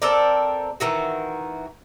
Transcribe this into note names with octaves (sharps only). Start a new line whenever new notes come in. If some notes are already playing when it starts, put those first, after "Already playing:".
C4 A4 A#4 D5
D#3 E3 F#4